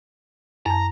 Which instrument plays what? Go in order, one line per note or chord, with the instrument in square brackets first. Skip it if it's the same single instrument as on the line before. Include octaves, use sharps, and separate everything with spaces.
[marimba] F#2 A5 [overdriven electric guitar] A#5